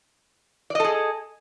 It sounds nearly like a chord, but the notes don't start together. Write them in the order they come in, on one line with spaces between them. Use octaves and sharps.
D5 D#5 A4 G#4